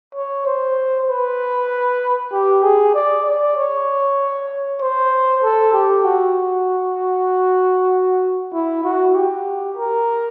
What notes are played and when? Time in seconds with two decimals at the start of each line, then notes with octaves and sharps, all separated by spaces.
0.15 C#5
0.46 C5
1.08 B4
2.32 G4
2.63 G#4
2.94 D5
3.25 D5
3.57 C#5
4.81 C5
5.43 A4
5.73 G4
6.04 F#4
8.53 E4
8.84 F#4
9.15 G4
9.77 A#4